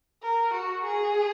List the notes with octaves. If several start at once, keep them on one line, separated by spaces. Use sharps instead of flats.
A#4
F#4
G#4